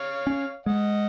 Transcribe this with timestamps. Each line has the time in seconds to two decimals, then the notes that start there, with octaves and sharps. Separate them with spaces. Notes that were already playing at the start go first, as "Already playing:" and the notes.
Already playing: C#5 F5
0.27 C#4
0.66 G#3 D#5 F#5